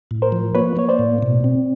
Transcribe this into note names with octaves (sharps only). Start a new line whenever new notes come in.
A2
A#4 C5
F3
A#3 B4 C#5
A#3 C#5
C5 D5
A2
B2
C4